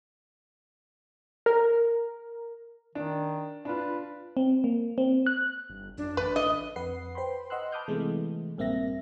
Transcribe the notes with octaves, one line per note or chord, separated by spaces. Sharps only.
A#4
D#3 D4
D4 F4 B4
C4
A#3
C4
F#6
G1
F#2 D4
A1 B4
D#5
F2 B4 F#5 C7
B4 C5 G5 B5 C6
D#5 F#5 C6 E6 F#6
A5 B5 D6 D#6 F6 G6
C3 E3 G#3 A3 B3
A#1 G2 A#3 C4 E5 A#6